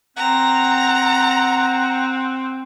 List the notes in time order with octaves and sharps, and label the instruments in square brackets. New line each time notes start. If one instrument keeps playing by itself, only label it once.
[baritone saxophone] C4 [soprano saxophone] F#5 [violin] A#5